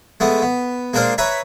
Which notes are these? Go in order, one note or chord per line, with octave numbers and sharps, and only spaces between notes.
G#3 A3 B3
B3
G#3 A#3 D4 C5 F5
B4 C#5 E5 A#5